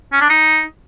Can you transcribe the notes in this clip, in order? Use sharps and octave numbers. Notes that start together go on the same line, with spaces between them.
C#4
D4
D#4